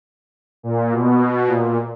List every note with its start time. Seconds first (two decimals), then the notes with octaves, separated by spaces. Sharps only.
0.63 A#2
0.93 B2
1.48 A#2